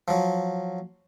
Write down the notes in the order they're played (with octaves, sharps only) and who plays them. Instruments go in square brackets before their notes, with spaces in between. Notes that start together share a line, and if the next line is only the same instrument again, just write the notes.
[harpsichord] F3 F#3